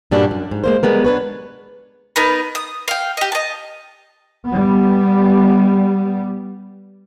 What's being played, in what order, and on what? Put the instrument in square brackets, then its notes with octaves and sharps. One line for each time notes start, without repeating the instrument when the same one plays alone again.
[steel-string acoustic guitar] G2 A#2 G3 C#4 D4 F#4
F#2
G#2
G#3 A#3 C5
G3 G#3 B3 A#4
D4 B4 C#5
[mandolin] B3 D#4 A#4 B4
D#6
F5 G5
G4 D#5
D#5 A5
[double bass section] G3 B3